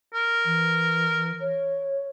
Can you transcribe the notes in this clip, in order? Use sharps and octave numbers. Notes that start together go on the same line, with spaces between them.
A#4
E3
C#5